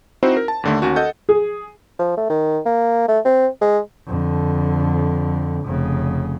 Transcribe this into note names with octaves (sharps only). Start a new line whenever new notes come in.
C4 D#4 E4 F#4 C5
A#4
A5
D#2 D3 A3
D#2 C#4 F#4
A4 D#5 F#5 G6
G#4
F3
A3
D#3
A#3
A3
C4
G#3
F2 D3
F1 C#3